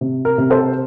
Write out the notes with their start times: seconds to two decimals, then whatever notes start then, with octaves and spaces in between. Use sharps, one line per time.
0.01 C3
0.25 A#4
0.38 C3
0.50 A4 C5